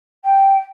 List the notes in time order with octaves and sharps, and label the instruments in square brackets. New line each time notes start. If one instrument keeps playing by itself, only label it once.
[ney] G5